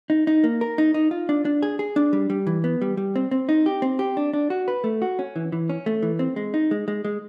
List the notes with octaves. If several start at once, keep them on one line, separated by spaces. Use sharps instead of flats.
D#4
D#4
A#3
A#4
D#4
D#4
F4
D4
D4
G#4
G#4
D4
G3
G3
E3
B3
G3
G3
C4
C4
D#4
G4
C4
G4
D4
D4
F#4
B4
A3
F#4
C#4
E3
E3
C#4
A3
E3
C4
G#3
D#4
G#3
G#3
G#3